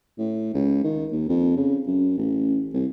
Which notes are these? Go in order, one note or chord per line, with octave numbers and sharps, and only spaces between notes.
A2
C#2
D#3
D#2
F2
C#3
F#2
A1
C2